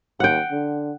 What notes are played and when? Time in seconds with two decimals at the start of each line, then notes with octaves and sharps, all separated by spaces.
0.20 D#2 F#5 G5
0.51 D3